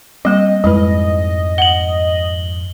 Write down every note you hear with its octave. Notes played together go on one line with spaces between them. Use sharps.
G3 A#3 C4 D#5
F2 G#2 G#3 E4 B4 D#5
F#5 F#7 G7